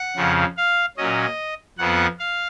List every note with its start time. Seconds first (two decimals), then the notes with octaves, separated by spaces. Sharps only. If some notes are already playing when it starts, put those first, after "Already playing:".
Already playing: F#5
0.16 F2 C#3 F3
0.57 F5
0.97 A#2 F#3 C#4 D#5
1.78 F2 F3 B3 F#5
2.19 F5